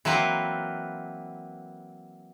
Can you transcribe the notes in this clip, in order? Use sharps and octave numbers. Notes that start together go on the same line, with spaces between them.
E3 F#3 A#3 C4 B4